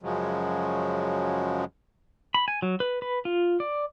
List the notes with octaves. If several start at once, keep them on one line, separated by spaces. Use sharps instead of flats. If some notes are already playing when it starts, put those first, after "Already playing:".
F#2 C#3 F3 F#3 G#3
B5
G#5
F#3
B4
B4
F4
D5